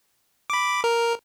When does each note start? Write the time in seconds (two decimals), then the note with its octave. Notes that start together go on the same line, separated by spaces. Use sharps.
0.50 B5 D6
0.84 A#4